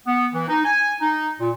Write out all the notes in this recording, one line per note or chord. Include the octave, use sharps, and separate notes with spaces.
B3
E3
D#4
G#5
D#4
A#2